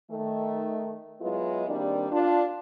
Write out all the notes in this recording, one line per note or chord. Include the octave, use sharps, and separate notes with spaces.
D#3 A3
F#3 G#3 B3 E4 F4
D#3 G3 A#3 C4 D4
D4 F4